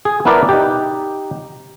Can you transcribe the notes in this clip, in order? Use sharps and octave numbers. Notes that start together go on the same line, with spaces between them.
G#4
B3 E4 A#4 B4 D5 A5
D#4 G4